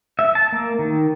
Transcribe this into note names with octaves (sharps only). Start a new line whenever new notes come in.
E5
A5
A#3
D#3